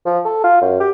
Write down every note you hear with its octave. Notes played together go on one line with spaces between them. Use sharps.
F3
A4
F4
F#2
G4